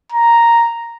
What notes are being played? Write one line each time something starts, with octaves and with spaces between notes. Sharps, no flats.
A#5